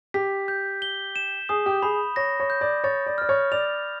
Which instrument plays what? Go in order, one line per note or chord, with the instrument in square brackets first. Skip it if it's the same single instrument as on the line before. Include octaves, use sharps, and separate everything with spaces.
[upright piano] G4 [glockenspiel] B6
[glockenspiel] G6
G7
E7
[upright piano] G#4 [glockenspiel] D#6
[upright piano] G4
[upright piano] G#4 [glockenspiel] B5
[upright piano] C#5 [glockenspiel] A#6
[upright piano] C#5
[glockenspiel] G6
[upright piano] D5
[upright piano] C#5 [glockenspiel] A6
[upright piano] D5
[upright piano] D5 [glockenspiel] F6
[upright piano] C#5
[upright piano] D5 [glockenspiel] F7